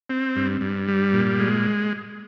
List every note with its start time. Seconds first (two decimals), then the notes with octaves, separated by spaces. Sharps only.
0.10 C4
0.36 G2
0.61 G2
0.88 G3
1.13 A#2
1.39 G#3